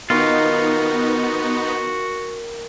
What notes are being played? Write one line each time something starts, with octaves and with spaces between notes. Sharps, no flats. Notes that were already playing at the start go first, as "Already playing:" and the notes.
D#3 B3 D#4 F4 F#4